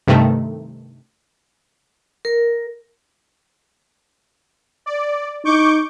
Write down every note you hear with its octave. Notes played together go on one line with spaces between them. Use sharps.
G2 C3 D#3 A3
A#4
D5
D#4 C#6 D6 G6